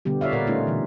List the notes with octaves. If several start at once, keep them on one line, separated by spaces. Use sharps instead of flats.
B2 D3 G3 B3 G4
F4 C#5 D5 E5 F5
A#2 A#4 B4 D5 F#5
A3 C#4 D#4 F4
B2 D3 E3 G3